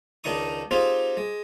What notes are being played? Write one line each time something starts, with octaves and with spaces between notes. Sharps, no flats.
C#2 D#3 D4 D#4 C#6 D#6
C4 D#4 F4 G4 G#4 C5
G#3